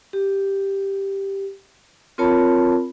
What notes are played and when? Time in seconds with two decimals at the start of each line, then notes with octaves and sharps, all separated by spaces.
0.13 G4
2.18 C4 F4 A#4 C#5 A5 B5